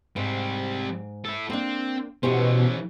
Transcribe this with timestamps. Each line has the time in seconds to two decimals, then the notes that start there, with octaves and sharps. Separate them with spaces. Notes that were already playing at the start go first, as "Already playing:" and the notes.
0.16 G#2 G3 C4
1.25 E4 A4
1.50 A#3 C4 D4
2.23 B2 E3 C#4 E4 G4 C5